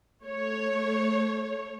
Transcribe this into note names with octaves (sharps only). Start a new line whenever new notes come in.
A3 C#5